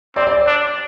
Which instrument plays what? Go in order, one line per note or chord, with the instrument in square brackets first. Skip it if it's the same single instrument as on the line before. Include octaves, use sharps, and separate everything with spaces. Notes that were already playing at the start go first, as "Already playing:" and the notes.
[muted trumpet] C4 [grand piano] D5
[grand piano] D5
[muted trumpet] D4